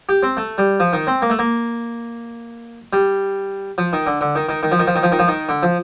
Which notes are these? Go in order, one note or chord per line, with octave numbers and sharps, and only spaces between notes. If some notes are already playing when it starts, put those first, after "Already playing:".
G4
C4
A3
G3
F3
D#3
C4
A#3
A3
A#3
G3
F3
D#3
D3
D3
D#3
D#3
D#3
F3
D#3
F3
D#3
F3
D#3
F3
D#3
D3
F3